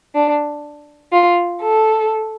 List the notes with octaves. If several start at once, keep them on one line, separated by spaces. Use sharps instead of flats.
D4
F4
A4